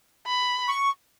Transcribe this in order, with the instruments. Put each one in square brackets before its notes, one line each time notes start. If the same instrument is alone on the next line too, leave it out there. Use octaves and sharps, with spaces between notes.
[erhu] B5
[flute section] C#6